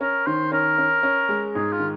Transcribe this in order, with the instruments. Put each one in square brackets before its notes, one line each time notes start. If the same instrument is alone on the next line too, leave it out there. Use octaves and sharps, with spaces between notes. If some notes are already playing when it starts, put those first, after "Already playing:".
[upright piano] C#4 [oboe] A#4
[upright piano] D#3 [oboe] C5
[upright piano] C#4 [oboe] A#4
[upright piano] C#4
C#4
G#3
[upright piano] G#2 [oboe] G#4
[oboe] F4
[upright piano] D#3